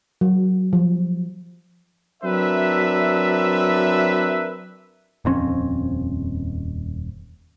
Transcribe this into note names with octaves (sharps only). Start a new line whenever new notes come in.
F#3
F3
F#3 C4 D4 A#4 B4 E5
D#1 F2 C4 C#4